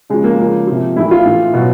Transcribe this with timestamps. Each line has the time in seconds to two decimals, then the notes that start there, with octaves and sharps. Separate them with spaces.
0.10 C#3 F3 G#3
0.24 A#3
0.39 C#3 F3
0.67 C3 F3
0.96 A2 E3 E4
1.11 F4
1.25 A2 E3
1.54 B2 F#3